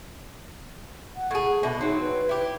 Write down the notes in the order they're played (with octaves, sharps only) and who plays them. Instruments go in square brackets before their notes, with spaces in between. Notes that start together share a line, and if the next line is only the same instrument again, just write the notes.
[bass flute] F#5
[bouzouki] A2 G#4
[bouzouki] B2 D4 [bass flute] E5
[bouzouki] F#3 C4 [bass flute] D#4
[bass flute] B4
[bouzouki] E4 G4